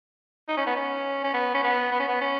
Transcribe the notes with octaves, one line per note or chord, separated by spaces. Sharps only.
D#4
C#4
B3
C#4
C#4
B3
C#4
B3
B3
C#4
B3
C#4